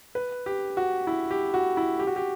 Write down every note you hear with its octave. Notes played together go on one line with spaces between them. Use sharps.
B4
G4
F#4
E4
G4
F#4
E4
G4
F#4
G4